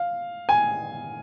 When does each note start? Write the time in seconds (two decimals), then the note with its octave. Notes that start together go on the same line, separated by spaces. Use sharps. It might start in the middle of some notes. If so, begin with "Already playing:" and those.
Already playing: F5
0.49 G#5